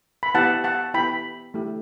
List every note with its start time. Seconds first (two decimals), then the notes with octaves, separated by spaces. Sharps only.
0.23 B5
0.35 B3 E4 G4 F#5 A5
0.64 F#5 A5
0.94 B3 E4 G4 G5 B5
1.54 A3 E4 G4